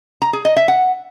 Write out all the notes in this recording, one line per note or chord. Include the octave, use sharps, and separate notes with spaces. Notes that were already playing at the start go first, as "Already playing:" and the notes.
A#5
G#4
D#5
E5
F#5